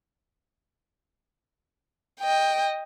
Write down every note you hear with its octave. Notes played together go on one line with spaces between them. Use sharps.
D#5 G5